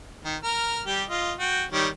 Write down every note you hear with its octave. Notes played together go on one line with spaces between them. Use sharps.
D#3
A#4 F6
G3 G4
F4 D#5
F#4 G5
D#3 G3 C#5